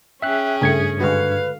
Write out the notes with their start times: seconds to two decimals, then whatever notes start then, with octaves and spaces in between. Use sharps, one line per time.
0.22 C#4 G#4 E5 G5 F#6
0.61 G2 C#3 A3 G#6 C#7
1.01 D3 G#3 F#4 B4 F5